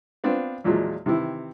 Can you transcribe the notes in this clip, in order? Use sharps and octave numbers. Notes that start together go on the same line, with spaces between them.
B3 C4 D4 F4
E2 A#2 F3 F#3 G#3
C3 D#3 E3 E4